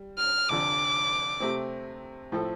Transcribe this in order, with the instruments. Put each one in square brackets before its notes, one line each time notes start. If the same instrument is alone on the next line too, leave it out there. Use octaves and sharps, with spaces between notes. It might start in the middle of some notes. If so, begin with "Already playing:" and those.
Already playing: [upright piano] G3
[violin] F6
[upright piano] F1 F2 D3 [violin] D6
[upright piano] C3 A3 C4
A2 F3 C4 A4